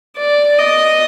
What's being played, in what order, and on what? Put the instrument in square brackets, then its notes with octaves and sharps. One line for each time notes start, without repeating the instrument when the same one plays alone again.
[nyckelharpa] D5
D#5